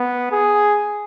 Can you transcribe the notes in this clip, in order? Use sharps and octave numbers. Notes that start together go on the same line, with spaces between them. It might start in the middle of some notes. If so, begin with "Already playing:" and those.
Already playing: B3
G#4